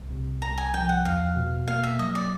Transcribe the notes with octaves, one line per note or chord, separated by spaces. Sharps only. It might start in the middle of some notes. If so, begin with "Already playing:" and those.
Already playing: C2
C3
C2 A#5
G#5
F3 G5
F#5
E2 F5
B2
A#3 F5
E5
F#3 D#5
D5